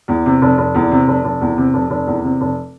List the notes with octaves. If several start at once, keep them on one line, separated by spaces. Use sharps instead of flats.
E2
C3
F1
F1
E2
C3
F1
F1
E2
C3
F1
F1
E2
C3
F1